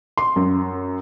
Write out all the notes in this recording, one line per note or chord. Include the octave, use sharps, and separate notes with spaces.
C6
F#2